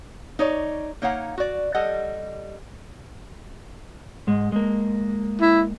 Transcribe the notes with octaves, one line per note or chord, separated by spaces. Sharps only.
D#4 C#5 D5
A#3 D#4 C#5 F5 F#5
F#4 D5
G3 A4 D#5 F#5
G#2 G#3
G#3 A#3
E4